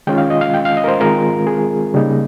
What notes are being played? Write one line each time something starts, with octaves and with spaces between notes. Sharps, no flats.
D#3 G#3 C#4 F4 G5
F5
D#5
F5
G5
F5
D#5
A#4
C5
D#3 G#3 C4 F4 A#4
G#4
C#3 G3 A#3 D#4